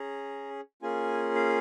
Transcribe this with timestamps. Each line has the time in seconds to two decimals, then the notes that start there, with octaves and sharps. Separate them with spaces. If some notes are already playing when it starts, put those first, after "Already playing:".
Already playing: C#4 G#4 A#5
0.82 A#3 C#4 F4 G#4 G#5
1.36 F5